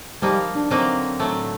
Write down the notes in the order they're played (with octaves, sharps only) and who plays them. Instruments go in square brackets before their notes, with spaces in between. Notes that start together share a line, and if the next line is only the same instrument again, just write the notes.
[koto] F3 A#3 D#4 [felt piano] G3
[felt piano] D4
[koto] D3 F#3 A#3 D#4 [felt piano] C4
[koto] A2 F#3 A3